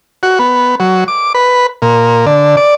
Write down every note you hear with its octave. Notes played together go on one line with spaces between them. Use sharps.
F#4
B3
F#3
D6
B4
A#2
D3
D5